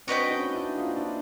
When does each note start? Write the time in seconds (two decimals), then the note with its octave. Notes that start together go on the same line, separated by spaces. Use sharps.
0.07 C4 D4 F#4 B4 D#5 G5
0.30 C#4 D#4
0.54 D4 E4
0.78 D#4 F4
0.96 D4 E4